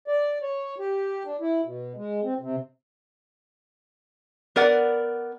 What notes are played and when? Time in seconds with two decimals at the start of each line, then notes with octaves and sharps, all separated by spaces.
0.08 D5
0.42 C#5
0.79 G4
1.25 D4
1.40 E4
1.65 B2
1.96 G#3
2.24 C4
2.40 C3
4.56 B3 A#4 D5 F#5